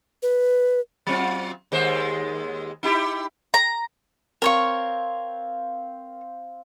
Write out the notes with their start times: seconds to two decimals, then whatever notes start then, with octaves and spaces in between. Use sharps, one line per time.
0.23 B4
1.07 F#3 C4 F4
1.72 D#2 G#3 C5
2.83 D#4 E4 G4
3.54 A#5
4.42 C4 A#4 C#5 F5 C#6